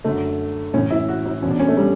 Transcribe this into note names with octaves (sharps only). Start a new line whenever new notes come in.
F#2 D3 A3
A2 E3 C#4
E4
F#4
E4
E2 B2 C#4 D4
C#4
A3
G3